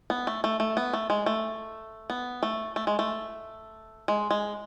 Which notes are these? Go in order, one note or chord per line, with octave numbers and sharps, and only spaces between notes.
B3
A3
A3
A3
B3
A3
G#3
A3
B3
A3
A3
G#3
A3
G#3
G#3